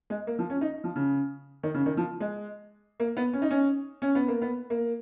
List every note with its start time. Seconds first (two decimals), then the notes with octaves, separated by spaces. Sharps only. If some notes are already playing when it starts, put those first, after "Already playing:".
0.10 G#3
0.27 A#3
0.39 F3
0.50 C#4
0.61 D#4
0.84 F3
0.96 C#3
1.63 D#3
1.74 C#3
1.86 D#3
1.97 F3
2.20 G#3
3.00 A#3
3.17 B3
3.33 C#4
3.42 D#4
3.51 C#4
4.02 C#4
4.15 B3
4.28 A#3
4.42 B3
4.70 A#3